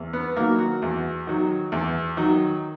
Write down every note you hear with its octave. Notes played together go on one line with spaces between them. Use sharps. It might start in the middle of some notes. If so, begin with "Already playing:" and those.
Already playing: E2
B3
D#3 F#3 A#3
F#4
E2
D#3 F#3
E2
D#3 F#3